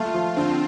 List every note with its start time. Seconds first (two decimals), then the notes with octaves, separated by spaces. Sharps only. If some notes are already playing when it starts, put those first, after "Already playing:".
Already playing: A3 F4
0.14 F3
0.36 D3 C4